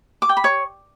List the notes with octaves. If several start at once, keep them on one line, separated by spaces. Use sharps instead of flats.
D6
G5
B5
C#5